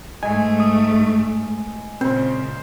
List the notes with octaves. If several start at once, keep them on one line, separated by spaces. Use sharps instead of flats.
G#2 G#3 A3 G#5
D#6
A#2 C#3 C4 C5